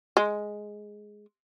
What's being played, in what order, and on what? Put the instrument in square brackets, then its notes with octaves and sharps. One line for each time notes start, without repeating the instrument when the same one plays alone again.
[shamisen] G#3